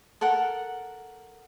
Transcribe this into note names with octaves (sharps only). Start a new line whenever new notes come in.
A4 A#4 F#5